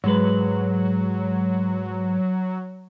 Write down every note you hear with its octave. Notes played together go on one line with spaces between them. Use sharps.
G#2 F#3 G#3 B4